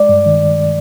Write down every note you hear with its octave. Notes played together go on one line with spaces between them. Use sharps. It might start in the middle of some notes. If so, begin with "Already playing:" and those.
Already playing: G#3 D5
G2
D#3